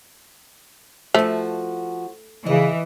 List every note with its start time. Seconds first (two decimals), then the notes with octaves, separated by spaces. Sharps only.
1.14 F3 A3 F#4
2.46 C#3 E3 D#5